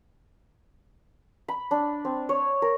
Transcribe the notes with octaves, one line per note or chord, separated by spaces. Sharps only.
B5
D4
C4
C#5
A#4